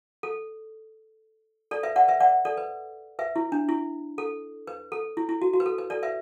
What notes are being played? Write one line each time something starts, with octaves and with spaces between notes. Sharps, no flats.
A4
A4 D5
B4 E5
D5 F#5
B4 E5
D5 F#5
A4 D5
B4
B4 E5
E4
D4
E4
A4
B4
A4
E4
E4
F#4
F#4
B4
A4
B4
A4 D5
B4 E5